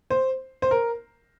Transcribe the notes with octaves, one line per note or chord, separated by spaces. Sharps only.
C5
C5
A#4